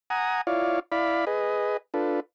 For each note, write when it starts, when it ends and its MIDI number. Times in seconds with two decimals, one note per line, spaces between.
0.10 0.41 78
0.10 0.41 80
0.10 0.41 82
0.10 0.41 87
0.47 0.79 64
0.47 0.79 65
0.47 0.79 73
0.47 0.79 74
0.47 0.79 77
0.92 1.25 64
0.92 1.25 74
0.92 1.25 77
0.92 1.25 83
1.27 1.77 68
1.27 1.77 71
1.27 1.77 75
1.94 2.20 62
1.94 2.20 65
1.94 2.20 69
1.94 2.20 71